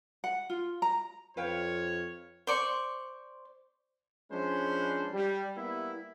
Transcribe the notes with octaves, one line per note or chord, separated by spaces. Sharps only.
F#5
F4
A#5
F2 B4 C#5 F5 G5
C5 D5 C#6
F3 G#3 C#4 D4 B4 C5
G3
G3 A#3 B3 E4